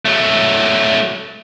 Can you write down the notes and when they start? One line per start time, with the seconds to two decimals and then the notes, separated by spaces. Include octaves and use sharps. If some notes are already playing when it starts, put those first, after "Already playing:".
0.05 F#3 A3